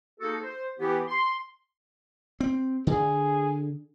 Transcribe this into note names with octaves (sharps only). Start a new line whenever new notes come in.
A#3 D#4 F#4 G#4 A4
C5
E3 B3 E4 G4
C6
C4
D3 G#4